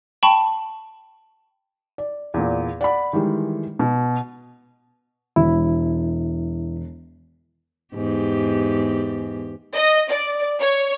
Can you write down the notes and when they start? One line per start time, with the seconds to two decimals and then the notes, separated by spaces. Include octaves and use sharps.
0.23 G5 A5 B5 C#6
1.98 D5
2.34 E2 A#2
2.81 D5 F#5 B5
3.13 D#3 E3 G3 G#3
3.79 B2
5.36 E1 E4
7.94 E2 G#2 G4
9.75 D#5
10.09 D5
10.59 C#5